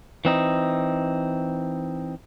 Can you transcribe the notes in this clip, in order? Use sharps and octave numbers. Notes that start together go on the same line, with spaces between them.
E3 C4 D#4